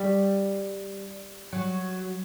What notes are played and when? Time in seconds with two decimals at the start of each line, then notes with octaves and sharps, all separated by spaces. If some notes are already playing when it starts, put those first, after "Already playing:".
Already playing: G3
1.53 F#3